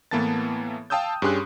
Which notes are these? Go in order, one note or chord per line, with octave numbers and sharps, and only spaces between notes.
A2 E3 A#3 B3 A5 A6
F5 G5 A5 D#6 E6 G6
G2 C#4 G4 G#4 C6 F#6